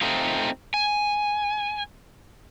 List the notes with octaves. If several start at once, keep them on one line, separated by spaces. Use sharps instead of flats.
A3 C4 D#4 F4
G#5